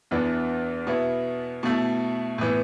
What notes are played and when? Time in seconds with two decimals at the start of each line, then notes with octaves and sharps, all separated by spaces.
0.11 E2 E3 B3 D4
0.87 B2 B3 E4
1.63 B2 A3 E4
2.38 A2 E3 B3